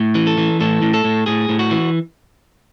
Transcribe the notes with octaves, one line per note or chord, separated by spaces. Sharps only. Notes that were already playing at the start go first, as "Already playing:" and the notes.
Already playing: A2
E3
A4
E3
A2 A4
A2
A4
A2
A2 G#4
A2
F#4
E3